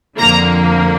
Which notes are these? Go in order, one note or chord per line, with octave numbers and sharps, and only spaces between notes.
F2 D3 F3 A#3 A#5